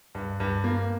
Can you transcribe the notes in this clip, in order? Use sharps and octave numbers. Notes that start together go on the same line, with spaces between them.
G2
G2
A#3